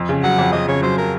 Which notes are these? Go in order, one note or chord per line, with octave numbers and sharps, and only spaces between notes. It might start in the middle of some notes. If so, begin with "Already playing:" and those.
Already playing: F2
C#3
F#3 F#5
F2
F2 D#5
C#3 C#5
F#3 C5
A#4